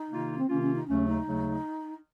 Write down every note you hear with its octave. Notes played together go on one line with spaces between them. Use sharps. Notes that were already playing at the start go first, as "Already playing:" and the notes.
Already playing: D#4
C3 D#3 A#3 F4
C4
C3 D#3 A#3 C#4 F4
C#4
D#4
D#2 C#3 F#3 A3 C#4
D#4
D#2 C#3 F#3 A3